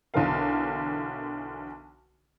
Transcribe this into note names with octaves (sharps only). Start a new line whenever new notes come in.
B1 D3 E3 A#4 F5